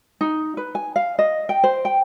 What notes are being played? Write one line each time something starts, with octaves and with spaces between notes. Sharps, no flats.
D#4
B4
G#5
F5
D#5
G5
C5
G5